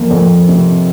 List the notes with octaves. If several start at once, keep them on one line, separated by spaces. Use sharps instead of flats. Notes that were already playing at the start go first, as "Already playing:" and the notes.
Already playing: F2 A#3
F2
C3